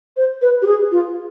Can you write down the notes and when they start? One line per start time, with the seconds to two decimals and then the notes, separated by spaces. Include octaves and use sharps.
0.17 C5
0.42 B4
0.62 G4
0.66 G#4
0.92 F4